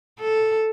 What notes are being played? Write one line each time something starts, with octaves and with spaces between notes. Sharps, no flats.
A4